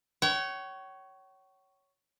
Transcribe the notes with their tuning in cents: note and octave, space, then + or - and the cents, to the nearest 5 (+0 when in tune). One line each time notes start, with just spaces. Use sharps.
C#5 +5 G5 -45